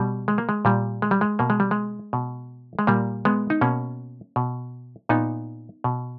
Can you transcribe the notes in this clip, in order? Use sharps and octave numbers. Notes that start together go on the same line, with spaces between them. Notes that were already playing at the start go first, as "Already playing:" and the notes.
Already playing: B2 G3
G#3
A#3
G#3
A#2 G3
G#3
G3
G#3
B2 A#3
G#3
G3
G#3
B2
G#3
A#2 G3 A#3
G#3 B3
D#4
B2 A#3 C#4
B2
A#2 B3 D#4
B2